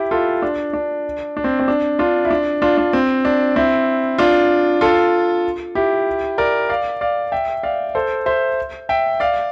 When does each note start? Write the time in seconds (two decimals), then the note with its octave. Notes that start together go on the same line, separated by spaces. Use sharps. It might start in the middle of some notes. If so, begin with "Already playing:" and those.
Already playing: E4 G4
0.11 F4 A4
0.42 D4
0.73 D4
1.37 D4
1.44 C4
1.59 C4
1.68 D4
1.99 D4 F4
2.25 E4
2.31 D4
2.62 D4 F4
2.78 D4
2.93 C4
3.25 D4
3.56 C4 E4
4.18 D4 F4
4.81 F4 A4
5.75 E4 G4
6.38 A#4 D5
6.69 D5 F5
7.01 D5 F5
7.32 E5 G5
7.63 D5 F5
7.95 A4 C5
8.26 C5 E5
8.89 E5 G5
9.20 D5 F5